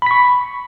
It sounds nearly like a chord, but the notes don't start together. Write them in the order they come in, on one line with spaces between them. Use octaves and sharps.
B5 B6 C#6